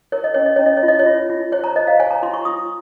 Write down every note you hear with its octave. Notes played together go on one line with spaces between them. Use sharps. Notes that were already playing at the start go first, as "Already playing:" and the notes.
A#4 C#5
D#5
C#4 C#5
D#5
C#4 C#5
D#5
C#5
F4
D#5
C#5
F4
F4
C5 C#5
A#5
C5 D#5
F5
C#5 G#5
A#5
F4 C6
C#6
F4 D#6